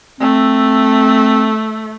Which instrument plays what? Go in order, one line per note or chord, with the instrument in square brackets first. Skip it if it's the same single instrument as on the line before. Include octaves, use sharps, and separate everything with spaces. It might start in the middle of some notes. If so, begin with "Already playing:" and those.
[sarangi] A3 [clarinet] C4